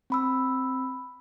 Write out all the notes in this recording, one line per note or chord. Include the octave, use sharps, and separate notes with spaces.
C4 B5 E6